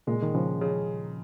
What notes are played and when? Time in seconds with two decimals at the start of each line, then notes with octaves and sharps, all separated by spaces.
0.07 A#2 C#3 G#3
0.22 D#3
0.34 C#3 F3 G#3
0.61 C#3